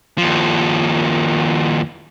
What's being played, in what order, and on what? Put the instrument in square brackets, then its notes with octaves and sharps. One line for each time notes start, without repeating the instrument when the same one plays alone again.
[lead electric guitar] D#2 F3